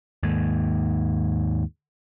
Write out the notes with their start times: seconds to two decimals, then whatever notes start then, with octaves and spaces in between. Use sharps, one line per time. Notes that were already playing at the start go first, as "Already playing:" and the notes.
0.23 D#2 G#2